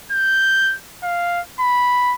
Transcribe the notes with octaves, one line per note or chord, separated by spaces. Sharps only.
G6
F5
B5